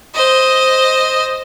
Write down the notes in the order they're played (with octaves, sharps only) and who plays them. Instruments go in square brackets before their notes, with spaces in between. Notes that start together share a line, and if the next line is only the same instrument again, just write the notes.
[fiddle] C5 D#5